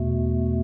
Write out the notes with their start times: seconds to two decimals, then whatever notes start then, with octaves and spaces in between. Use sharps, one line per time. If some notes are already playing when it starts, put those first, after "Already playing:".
Already playing: E2 B2 A3